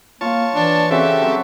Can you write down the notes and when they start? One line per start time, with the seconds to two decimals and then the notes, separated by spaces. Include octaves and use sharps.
0.21 A#3 F4 C#5 F5 A5
0.54 E3 D4
0.91 C#3 C4 F#4 G4 A4 E5
1.21 F#3 C4